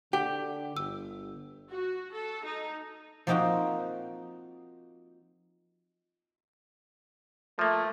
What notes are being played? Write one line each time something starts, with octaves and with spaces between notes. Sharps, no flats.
D3 G4 F#5
G1 E6
F#4
A4
D#4
F3 A#3 C4 D#4 F#4 A#5
F3 A3 A#3